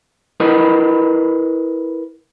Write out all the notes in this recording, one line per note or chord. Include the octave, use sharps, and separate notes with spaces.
E4 A#4 B4 D#5